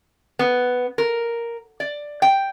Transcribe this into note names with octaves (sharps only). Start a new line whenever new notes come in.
B3
A#4
D5
G5